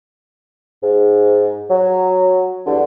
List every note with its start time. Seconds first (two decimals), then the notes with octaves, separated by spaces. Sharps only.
0.82 G#2
1.69 F#3
2.65 E2 G2 D3